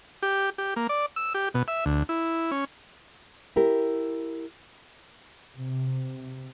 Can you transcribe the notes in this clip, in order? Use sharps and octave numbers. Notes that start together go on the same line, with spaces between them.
G4
G4
A#3
D5
E6
G4
B2
E5
D2
E4
C#4
E4 G4 A#4
C3